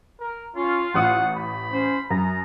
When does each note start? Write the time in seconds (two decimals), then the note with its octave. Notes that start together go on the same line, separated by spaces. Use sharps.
0.20 A#4
0.56 C#4 F4
0.94 A1 F#5 D#6
1.36 B5
1.72 C#4 C5
2.10 F#2 A#5